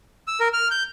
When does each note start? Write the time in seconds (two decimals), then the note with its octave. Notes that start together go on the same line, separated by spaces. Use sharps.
0.28 E6
0.40 A#4
0.53 F6
0.71 G6